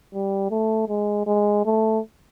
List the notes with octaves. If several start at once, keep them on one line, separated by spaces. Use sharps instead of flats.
G3
A3
G#3
G#3
A3